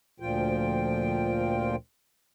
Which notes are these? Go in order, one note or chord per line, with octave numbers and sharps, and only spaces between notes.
D2 A#2 F3 F4 G5